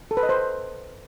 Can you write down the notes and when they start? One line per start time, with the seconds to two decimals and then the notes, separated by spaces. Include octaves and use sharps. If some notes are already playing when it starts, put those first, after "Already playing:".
0.11 A4
0.17 B4
0.23 D#5
0.29 C5